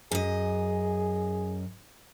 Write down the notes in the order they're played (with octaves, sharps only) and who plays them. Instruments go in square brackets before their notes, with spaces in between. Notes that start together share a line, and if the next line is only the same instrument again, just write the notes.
[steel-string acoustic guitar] F#2 D#5 [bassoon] G#4